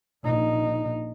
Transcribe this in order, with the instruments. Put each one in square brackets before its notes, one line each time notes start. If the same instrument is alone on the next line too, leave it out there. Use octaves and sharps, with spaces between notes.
[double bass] A#1 D#4